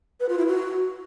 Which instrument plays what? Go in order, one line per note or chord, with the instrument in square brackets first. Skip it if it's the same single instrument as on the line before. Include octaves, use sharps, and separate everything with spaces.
[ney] B4
F4
E4
F#4